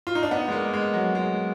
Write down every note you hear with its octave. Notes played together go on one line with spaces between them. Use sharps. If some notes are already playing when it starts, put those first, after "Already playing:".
F4
D#4
D4
B3
G#3
A#3
G#3
F#3
G#3